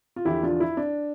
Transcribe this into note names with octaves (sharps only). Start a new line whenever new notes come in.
F4
E2 D3 F3 E4 G4
D4 F4
E4
D4